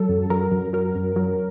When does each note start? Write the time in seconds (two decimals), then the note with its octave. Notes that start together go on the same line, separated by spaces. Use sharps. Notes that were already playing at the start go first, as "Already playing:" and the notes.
Already playing: F#3 A4
0.09 F#2
0.30 F#3 A#4
0.51 F#2
0.73 F#3 A#4
0.95 F#2
1.16 F#3